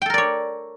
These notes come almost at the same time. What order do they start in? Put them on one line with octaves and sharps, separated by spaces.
G5 A4 A#4 D5 C#5